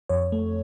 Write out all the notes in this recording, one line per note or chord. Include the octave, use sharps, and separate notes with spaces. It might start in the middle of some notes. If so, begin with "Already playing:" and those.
F2 C#5
A3